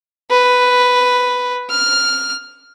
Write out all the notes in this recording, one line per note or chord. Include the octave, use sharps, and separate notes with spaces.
B4
F6